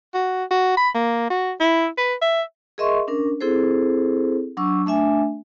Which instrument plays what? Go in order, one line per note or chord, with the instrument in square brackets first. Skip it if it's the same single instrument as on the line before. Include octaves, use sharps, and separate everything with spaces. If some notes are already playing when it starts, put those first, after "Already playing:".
[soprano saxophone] F#4
F#4
B5
A#3
F#4
E4
B4
E5
[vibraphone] G#4 A#4 D#5 E5 C6 C#6
C#4 D4 A#4
C4 E4 G#4 A4 C5
F#3 D4 C#6 E6
A3 D4 E5 G#5